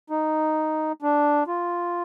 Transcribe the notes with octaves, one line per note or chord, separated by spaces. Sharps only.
D#4
D4
F4